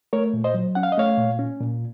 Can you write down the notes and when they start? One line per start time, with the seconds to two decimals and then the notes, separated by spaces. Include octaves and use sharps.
0.13 A3 A#4 C#5
0.34 A#2
0.44 C5 D#5
0.54 F#3
0.75 C#4 F#5
0.83 F5
0.92 D#5
0.97 A3 C#5 F5
1.18 A#2
1.39 C#4
1.61 A#2